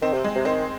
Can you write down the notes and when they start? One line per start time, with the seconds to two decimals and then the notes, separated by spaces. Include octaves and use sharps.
0.02 D#3 C4
0.13 C3
0.24 G#3
0.35 C3
0.45 D#3 C4